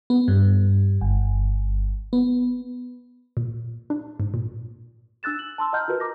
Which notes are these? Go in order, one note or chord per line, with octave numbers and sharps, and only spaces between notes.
B3
G2
G1
B3
A#2
D4
G#2
A#2
D4 E6 F#6 A6 E7
F#7
A5 C6 E6
D#5 F#5 A#5 F6 G6
F4 F#4 A#4 B4
A#5 D6 A#6